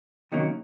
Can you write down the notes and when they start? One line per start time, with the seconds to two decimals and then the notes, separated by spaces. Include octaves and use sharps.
0.32 C3 D#3 F#3 A#3 C#4